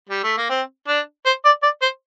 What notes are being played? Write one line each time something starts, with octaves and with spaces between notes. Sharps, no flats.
G3
A3
A#3
C4
D4
C5
D5
D5
C5